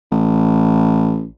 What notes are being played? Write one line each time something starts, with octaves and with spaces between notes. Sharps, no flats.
A1